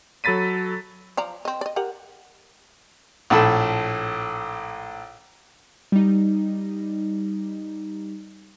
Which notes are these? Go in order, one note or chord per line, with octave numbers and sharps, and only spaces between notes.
F#3 A4 B5 A6 B6 D#7
F3 D5 A#5
C4 D#5
D5 D#5
G4 A#4 F#5
A#1 A2 A3 A4 A5 B5
G3 D#4